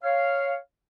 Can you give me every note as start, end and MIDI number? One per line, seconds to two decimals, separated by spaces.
0.03 0.55 73
0.03 0.55 77